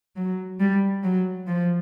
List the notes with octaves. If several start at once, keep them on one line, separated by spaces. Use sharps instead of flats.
F#3
G3
F#3
F3